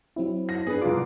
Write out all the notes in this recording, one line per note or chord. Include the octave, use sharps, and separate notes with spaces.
F#3 C4 E4
A#6
B3 D4 G#4 B4
C2 F4 D6